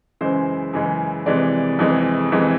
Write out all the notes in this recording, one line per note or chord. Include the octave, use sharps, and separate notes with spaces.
F#2 C#3 E3 G#3 C5
F#2 C#3 E3 G#3
F2 C3 E3 G#3 D5
F2 C3 E3 G#3
F2 C3 E3 G#3